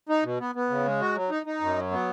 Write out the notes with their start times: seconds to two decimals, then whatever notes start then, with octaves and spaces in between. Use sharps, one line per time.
0.09 D#4
0.24 B2
0.40 B3
0.55 B3
0.70 C#3
0.86 G#3
1.01 F#4
1.15 F#3
1.30 D#4
1.46 D#4
1.61 F#2
1.76 F#3
1.91 B3